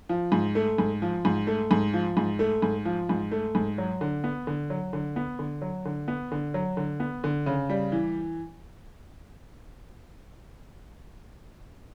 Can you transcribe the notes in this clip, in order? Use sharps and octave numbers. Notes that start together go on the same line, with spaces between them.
F3
G#2
A3
G#2
F3
G#2
A3
G#2
F3
G#2
A3
G#2
F3
G#2
A3
G#2
F#3
D3
B3
D3
F#3
D3
B3
D3
F#3
D3
B3
D3
F#3
D3
B3
D3
C#3
G3
E3